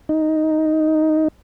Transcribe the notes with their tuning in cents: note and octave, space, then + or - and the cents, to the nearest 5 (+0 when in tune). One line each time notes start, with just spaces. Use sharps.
D#4 +5